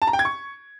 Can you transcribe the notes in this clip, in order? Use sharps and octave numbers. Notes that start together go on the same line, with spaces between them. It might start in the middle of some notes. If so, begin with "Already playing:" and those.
A5
A#5
G5
G#6
C#6